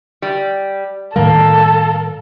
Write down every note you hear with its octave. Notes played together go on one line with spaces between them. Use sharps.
G3
A2 D#3 G3 A#3 A4